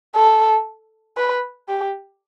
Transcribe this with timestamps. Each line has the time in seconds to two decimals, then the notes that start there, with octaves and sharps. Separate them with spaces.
0.15 A4
1.17 B4
1.68 G4